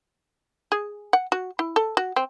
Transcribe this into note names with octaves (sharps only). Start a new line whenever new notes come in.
G#4
F#5
F#4
E4
A4
F#4
C4